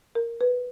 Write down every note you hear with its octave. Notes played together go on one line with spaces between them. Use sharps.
A#4
B4